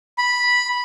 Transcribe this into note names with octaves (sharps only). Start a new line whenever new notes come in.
B5